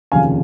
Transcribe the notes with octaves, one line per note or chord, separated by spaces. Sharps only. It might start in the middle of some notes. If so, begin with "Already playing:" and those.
F1 D#2 C#3 F3 F5 G#5